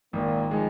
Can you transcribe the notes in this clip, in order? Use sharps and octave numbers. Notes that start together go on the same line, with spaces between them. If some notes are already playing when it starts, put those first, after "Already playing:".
G#1 A#2 A#3
F3 G#3 D#4